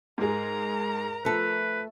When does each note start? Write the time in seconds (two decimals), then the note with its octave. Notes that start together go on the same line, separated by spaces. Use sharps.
0.18 G#2 G#4 A#4 A#5
1.25 F3 A3 A4 B4